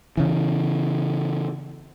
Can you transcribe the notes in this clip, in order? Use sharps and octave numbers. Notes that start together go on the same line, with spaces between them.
C#3 E3